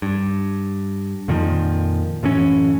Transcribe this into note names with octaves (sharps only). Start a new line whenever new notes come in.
G2
F2 A#2 D#3 F3
F#2 A2 E3 C#4